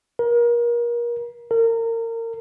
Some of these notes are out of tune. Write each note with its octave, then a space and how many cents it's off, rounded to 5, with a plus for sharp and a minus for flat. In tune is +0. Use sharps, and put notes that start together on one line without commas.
A#4 +30
A#4 -30